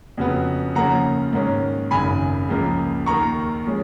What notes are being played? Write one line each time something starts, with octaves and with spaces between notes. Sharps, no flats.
F2 C#3 F#3 B3
D#2 C#3 F3 A#3 C#4 F#5 A#5
G#2 D#3 A#3 C#4
G#1 F#2 C#3 G#5 B5
C#2 C#3 F3 A#3
D#2 D#3 A#3 A#5 C#6
F3 G#3 C#4